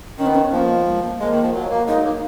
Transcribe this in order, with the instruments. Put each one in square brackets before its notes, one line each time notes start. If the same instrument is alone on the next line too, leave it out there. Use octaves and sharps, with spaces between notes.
[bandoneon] D#3 [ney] C#4
[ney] B3
C#4
[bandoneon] F3 [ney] A#3
[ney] G#3
A#3
[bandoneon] G#3 [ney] A#3
[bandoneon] D#3
F3
F#3
A#3
[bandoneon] G#3 [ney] D#4
[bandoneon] F#3
A#3